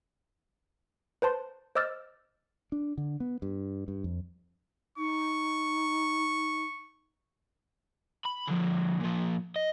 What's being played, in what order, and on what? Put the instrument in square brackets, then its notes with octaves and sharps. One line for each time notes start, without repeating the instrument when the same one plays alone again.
[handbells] B4 C5 A5 C6
C5 D#5 D6 E6 F6 A6
[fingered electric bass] D4
D3
B3
G2
G2
F2
[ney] D#4 [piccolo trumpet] C#6
[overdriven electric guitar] B5
D3 F3
A#2 F3
D#5